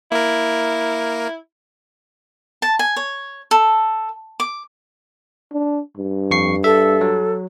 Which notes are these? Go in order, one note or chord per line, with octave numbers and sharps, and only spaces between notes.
A#3 E4 A#4
A5
G#5
C#5
A4
D6
D4
G2
F2 C#6 C7
A4 E5
F#3